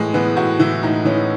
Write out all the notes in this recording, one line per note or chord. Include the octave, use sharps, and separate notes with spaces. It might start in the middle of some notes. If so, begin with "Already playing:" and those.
Already playing: A2 E3 G#3
E3 B3
A2 F#4
E3 E4
A2 D#4
E3 C#4